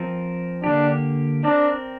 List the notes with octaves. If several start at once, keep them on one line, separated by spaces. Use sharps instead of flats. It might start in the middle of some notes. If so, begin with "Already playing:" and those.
Already playing: F3 C4 A#4
D3 A#3 D4 G4
C4 D4 A#4 D5